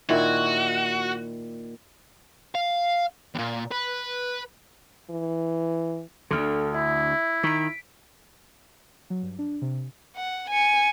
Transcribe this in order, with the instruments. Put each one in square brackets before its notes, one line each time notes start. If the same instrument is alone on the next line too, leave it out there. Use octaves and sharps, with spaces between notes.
[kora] A#2 D#3 E4 [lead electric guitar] F#4
[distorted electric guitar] F5
D#2 A#2
B4
[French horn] E3
[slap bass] D2 D3 [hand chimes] A4 F6
[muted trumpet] E4 [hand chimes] E5
[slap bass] D#3 [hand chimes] B6 D7
[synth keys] F#3
G2
D4
C3
[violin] F#5
G#5 C#7